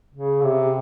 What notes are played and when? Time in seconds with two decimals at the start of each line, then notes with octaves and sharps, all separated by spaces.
0.14 C#3
0.44 C3